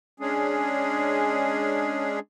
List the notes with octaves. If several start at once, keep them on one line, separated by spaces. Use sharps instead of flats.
G#3 C#4 D4 G#4